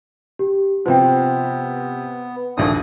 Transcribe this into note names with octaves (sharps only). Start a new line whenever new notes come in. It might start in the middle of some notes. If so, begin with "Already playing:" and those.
G4
C3 F3 B3 C5 G5
A#1 D#2 A3 D#6